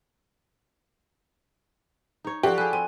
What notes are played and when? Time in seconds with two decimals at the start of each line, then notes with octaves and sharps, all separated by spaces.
2.25 D#4 C#5
2.43 F3 F#4 G4 A4 B4 D5
2.58 G#4 A4 B4 G#5 F#6
2.73 C4 G#5